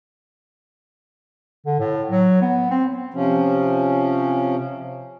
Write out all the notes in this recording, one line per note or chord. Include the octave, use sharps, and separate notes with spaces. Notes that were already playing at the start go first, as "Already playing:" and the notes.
D3
A2
F#3
B3
C4
C3 F3 C#4